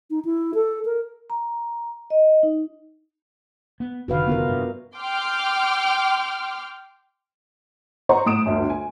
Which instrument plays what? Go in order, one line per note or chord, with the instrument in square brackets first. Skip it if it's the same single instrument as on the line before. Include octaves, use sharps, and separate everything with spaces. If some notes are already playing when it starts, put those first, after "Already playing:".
[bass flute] D#4
E4
A4
A#4
[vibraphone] A#5
D#5
D#4
[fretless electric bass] B3
[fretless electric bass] F1 D3 D#3 [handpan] F#4 B4 F5
[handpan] B3 F4 A#4
[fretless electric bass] G2 C3
[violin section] G5 C6 D6 F6
[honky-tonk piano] C5 D#5 F#5 A#5 C6 C#6
A2 D#6 D7 E7
G1 D2
G#5